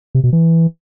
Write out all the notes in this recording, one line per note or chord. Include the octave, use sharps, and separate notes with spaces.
C3
B2
E3